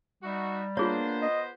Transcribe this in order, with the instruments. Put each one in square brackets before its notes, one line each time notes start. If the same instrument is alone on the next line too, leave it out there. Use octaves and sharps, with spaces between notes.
[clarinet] G3 [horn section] D#4 F#4 E5
[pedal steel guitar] A#3 D4 [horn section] B3 C5 [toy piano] F4 G#4 C#5
[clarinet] D#5